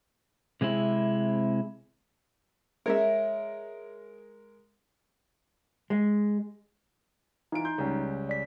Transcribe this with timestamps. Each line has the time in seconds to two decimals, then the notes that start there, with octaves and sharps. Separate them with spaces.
0.61 C3 G#3 C4 E4
2.86 G#3 A#4 C#5 E5
5.90 G#3
7.52 E3 D#4 F4 D7
7.65 C6 G6
7.78 C#2 G3 C#4
8.29 D5 B6